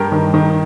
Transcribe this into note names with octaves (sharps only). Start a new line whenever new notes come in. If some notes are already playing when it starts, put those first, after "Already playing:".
Already playing: G2 G4 A#4
D#3
D#3